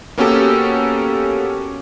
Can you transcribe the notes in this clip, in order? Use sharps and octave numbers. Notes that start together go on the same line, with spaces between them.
A#3 B3 C#4 F#4 G4 A4